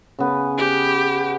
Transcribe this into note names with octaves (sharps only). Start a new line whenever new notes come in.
C#3 B3
G4